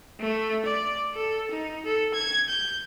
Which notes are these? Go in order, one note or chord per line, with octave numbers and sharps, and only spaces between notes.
A3
D5
A4
D#4
A4
G#6
G6